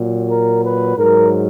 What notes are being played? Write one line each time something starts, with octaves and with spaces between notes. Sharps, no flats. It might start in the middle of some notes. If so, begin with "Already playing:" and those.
Already playing: A#2 F#3
A#4
B4
G#2 A#4
F#3